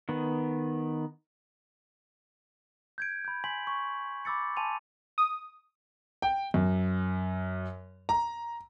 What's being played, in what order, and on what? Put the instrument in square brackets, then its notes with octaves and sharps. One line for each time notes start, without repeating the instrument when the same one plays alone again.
[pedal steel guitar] D#3 B3
[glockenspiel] G6 G#6 D7
B5 G6
G#5 C6 B6 F#7
C#6
B5 D6 E6 A6 C#7
G#5 A5 C6 D#7 F7
[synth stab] D#6
[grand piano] G5
F#2
A#5